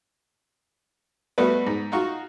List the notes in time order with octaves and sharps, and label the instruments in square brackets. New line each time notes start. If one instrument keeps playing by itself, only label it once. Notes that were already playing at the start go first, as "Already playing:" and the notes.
[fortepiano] G3 A3 B3 F#4 B4
G#2
D#4 F4 F#4 C#6